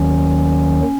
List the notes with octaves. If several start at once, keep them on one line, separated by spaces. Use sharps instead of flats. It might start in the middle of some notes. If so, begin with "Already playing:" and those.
Already playing: D#2 D#3 F#3 C#4